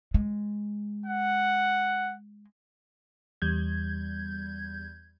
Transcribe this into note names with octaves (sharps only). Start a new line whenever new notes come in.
G#3
F#5
E2 G3 G6 G#6